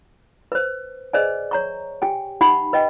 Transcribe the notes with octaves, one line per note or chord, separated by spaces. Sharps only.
B4 C5
G#4 B4 C5 D5 D#5 G#5
C#5 A#5 C#6
G4 G5 G#5
D#4 G4 F#5 B5 C#6
B4 D#5 G5